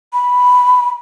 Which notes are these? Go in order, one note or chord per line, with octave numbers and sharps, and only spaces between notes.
B5